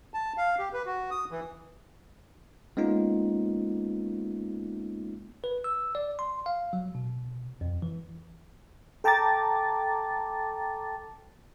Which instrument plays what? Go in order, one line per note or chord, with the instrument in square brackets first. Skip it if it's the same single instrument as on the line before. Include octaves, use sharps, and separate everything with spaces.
[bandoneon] A5
F5
G4
B4
F#4
D#6
E3
[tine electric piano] G#3 A#3 B3 C#4 D#4 F4
B4
E6
D5
C6
F5
F#3
B2
F2
E3
[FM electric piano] A4 G5 A5 A#5 D6 A6